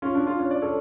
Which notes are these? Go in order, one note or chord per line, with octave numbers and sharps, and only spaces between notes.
C#4 F4
D4
C#4 F4
C#5
D5
A4 C#5